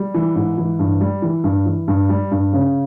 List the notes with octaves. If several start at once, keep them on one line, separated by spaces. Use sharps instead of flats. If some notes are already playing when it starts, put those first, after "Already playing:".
Already playing: G3
E3
G#2
E3
G2
G3
E3
G2
E3
G2
G3
G2
C#3